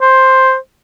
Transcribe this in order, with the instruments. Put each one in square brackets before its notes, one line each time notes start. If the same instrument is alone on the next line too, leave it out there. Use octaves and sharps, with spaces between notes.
[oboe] C5